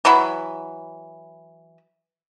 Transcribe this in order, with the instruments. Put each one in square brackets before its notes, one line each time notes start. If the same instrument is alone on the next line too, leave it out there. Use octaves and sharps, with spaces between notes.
[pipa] E3 F#3 E4 B5